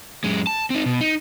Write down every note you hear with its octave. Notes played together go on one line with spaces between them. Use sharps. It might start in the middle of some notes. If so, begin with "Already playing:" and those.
F#2 G#3
A5
C4 D#4
B2
D#4